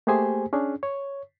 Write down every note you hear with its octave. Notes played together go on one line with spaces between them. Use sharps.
A3 A#3 G4 G#4 C5 G#5
C#4 D4 G#4
C#5